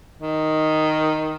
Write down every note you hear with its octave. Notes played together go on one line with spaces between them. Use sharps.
D#3